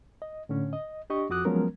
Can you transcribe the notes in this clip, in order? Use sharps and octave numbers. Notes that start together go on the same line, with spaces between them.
D#5
A2 D3 C#4
D#5
D4 G4 D#5 C#6
F2 F3 F#4 D6 D#6 F#6
F3 F#3 G#3 B3 C#4 A#4